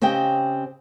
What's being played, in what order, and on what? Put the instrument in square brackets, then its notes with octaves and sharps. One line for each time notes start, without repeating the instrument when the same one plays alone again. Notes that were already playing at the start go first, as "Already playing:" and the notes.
[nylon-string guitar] C#3 C4 G4 D#5 G5